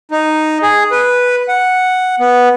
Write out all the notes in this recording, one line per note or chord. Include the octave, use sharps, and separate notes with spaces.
D#4
G#4
B4
F#5
B3